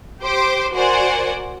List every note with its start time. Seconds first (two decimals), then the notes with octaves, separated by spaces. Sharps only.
0.22 G4 C5 C6 D6
0.73 F#4 A#4 C5 D5 F#5 G#5